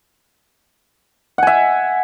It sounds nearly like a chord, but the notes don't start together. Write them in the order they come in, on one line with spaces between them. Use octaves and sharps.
F#5 G#5 E5